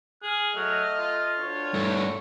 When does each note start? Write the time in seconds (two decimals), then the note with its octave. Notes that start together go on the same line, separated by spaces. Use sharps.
0.23 G#4 F6
0.55 F#3 A3 D#5
0.98 F4
1.38 D2 D4 C#5
1.74 G2 A3